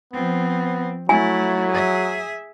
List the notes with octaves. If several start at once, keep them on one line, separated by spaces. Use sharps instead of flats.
F3 B3 C4
F#3 A3 E4 G#5
G#4 E5